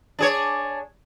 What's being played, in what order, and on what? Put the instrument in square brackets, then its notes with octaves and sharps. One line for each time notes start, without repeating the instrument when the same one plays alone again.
[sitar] D4 G#4 C#5